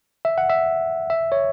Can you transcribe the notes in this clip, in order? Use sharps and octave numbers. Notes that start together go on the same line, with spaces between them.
E5
F#5
E5
E5
C#5